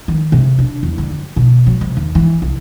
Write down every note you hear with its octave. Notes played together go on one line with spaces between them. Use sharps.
D#3
C3
D4
E2
D3
F#2
B2
F#3
C3
D#2
E3
C2